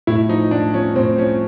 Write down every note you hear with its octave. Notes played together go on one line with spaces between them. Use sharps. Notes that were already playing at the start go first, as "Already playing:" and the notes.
A2 E4
F3 D#4
A2 D4
F3 C#4
A2 C4
F3 C#4